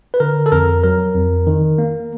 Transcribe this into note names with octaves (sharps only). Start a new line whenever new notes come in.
B4
D3 A#4
A4
F2 A#4
F#3 A#4
F2
D#3
A#3